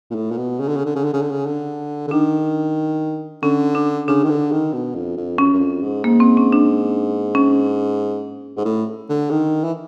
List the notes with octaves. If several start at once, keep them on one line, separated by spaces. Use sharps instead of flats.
A#2
A2
A#2
B2
C#3
D3
C#3
D3
C#3
D3
C#3
D3
C#3
D3
D3
D#3 D4
D3 C#4
D4
C#3 D4
D#3
D3
D#3
B2
F2
F2
F#2 C#4
F#2
F2
G#2
G#2 A#3
C4
C#4
D4
C#4
G#2
A2
D3
D#3
E3